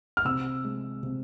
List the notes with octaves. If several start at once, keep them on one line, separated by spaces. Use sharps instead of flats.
F6
C3 E6
G#3
C3